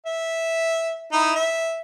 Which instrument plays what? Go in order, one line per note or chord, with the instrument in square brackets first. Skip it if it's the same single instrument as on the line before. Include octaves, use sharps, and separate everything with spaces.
[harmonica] E5
D#4 E4
E5